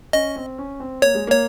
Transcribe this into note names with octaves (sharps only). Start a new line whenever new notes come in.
C#4 D#5
C4
C#4
C4
A#3 C#5
G#3
A#3 C#5